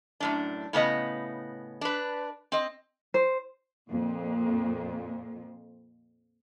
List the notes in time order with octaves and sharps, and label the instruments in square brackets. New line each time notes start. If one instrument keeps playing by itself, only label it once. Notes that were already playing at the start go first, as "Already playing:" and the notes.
[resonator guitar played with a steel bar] F#2 A2 D4
A2 C#3 B3 D#5
D4 B4
C4 D#5
[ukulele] C5
[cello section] F2 A#2